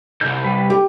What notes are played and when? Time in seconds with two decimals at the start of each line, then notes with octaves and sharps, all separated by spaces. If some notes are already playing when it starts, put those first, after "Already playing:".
0.21 C2 G#2 G6
0.44 G3 B4
0.70 G4